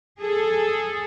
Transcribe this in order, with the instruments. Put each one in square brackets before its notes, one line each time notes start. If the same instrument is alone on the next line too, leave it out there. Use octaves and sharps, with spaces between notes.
[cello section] G#4 A4